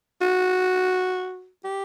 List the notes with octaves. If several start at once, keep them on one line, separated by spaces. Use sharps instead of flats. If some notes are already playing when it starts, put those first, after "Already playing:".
F#4
G4